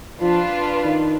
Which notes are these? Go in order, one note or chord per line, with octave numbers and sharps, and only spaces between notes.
F3 D4 F4 B4
D#3